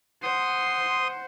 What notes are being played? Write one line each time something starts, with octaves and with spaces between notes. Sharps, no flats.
C5 F#5 C6 D#6